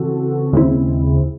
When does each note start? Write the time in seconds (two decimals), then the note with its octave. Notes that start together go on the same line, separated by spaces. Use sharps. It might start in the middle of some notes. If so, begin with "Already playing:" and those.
Already playing: C#3 E3 C4 F#4 A4
0.52 D#2 C#3 G#3 C4 E4